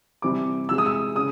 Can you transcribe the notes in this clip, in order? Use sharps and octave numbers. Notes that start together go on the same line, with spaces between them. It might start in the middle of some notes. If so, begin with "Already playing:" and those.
C3 E3 G3 C4 D6
C3 E3 G#3 E6
D#6
E6
C#3 D#6